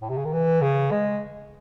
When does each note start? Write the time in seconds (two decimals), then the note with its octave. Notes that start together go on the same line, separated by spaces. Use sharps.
0.02 A2
0.09 C3
0.17 C#3
0.25 D#3
0.33 E3
0.61 C#3
0.91 G#3